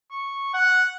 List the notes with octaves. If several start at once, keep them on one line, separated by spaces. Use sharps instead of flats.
C#6
F#5